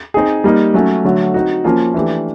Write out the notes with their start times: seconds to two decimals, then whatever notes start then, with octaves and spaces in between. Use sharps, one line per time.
0.14 C4 D#4 G#4
0.44 G3 A#3 D#4
0.74 F#3 A3 C#4
1.05 D3 F#3 A3
1.34 C4 D#4 F#4
1.64 F3 A#3 C#4 F4
1.94 E3 A3 D4 G4